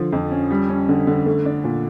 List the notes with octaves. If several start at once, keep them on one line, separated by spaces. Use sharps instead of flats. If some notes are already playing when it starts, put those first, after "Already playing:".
Already playing: D3 F3
F2
C#4
G3
C#4
D3
D3
A3
D4
A#2